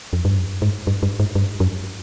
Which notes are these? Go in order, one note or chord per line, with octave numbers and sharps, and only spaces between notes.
F2
G2
F#2
G#2
G2
G2
G#2
G2
F#2